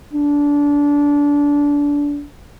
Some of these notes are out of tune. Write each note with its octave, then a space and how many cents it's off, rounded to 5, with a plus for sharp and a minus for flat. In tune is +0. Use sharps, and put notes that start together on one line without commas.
D4 -25